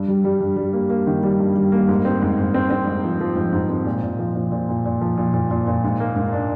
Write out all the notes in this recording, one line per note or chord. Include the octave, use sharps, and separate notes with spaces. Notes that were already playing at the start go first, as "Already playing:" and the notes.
Already playing: G2
G3
G3
G2
G3
A#3
A#3
D#3
G3
G2
G3
A#3
G#2
C4
G#2
G#2
C4
C4
G#2
F3
F3
G#2
G#2
C4
A#2
A#2
F3
A#2
A#2
A#2
A#2
F3
A#2
A#2
A#2
A#2
G#2
A#3
G#2
D4